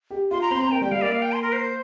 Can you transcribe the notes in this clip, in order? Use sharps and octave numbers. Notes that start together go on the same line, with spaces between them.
G4
F4 C6
A#5
C4 C6
C4 A#5
A#3 G5
G3 G5
G3 F5
A#3 D5
F5
G5
C6
A#4
C5